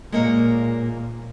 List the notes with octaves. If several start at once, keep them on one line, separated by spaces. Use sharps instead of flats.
A#2 G#3 A#3 C#5